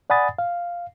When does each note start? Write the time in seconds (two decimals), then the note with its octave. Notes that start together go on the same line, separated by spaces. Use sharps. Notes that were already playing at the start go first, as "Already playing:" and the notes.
0.10 D5 F#5 G#5 B5 D#6 A6
0.38 F5